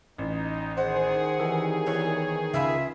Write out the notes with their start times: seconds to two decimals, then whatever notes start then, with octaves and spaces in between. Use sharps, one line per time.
0.18 A1 D#4
0.77 D#3 G#4 C5 F#5
1.40 C2 E3
1.86 E3 B3 C#5
2.54 C#2 F4 E5 B5